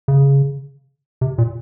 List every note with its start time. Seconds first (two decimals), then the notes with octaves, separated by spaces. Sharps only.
0.08 C#3
1.21 C3
1.38 A#2